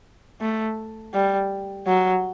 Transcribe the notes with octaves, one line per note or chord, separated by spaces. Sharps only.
A3
G3
F#3